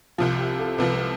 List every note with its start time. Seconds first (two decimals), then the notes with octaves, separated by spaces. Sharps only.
0.18 C2 C3 F3 F4
0.39 G4
0.59 A4
0.78 C2 C3 F3 B4
0.93 B4